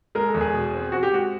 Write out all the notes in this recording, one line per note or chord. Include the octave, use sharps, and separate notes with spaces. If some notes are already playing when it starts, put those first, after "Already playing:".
G#3 A#4
A4
E2
G#4
B2
C4
C4 F#4
G4
G#3 F#4